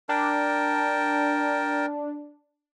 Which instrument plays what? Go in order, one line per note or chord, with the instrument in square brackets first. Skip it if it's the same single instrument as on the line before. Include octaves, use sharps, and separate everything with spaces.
[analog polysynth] D4 [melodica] A#4 G5 A5